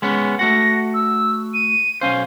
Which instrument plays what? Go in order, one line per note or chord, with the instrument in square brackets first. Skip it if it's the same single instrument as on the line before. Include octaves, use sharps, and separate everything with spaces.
[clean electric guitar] G#3 B3 C#4
[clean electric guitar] A3 F#4 F#5 [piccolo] A#6
[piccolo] E6
D#7
[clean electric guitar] B1 C#4 C5 [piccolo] F5